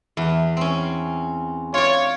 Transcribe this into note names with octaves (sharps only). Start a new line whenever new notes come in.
E2
C4 C#4
F4 C#5 D5